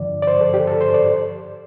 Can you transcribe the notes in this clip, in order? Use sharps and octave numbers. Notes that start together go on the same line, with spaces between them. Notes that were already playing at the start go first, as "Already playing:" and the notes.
Already playing: G2 D3 F3 D5
D5
C5
A4
G4
A4
C5
D5